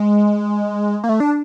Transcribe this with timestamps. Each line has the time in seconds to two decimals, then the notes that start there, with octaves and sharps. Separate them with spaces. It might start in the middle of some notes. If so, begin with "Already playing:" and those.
Already playing: G#3
1.04 A#3
1.09 A3
1.20 D4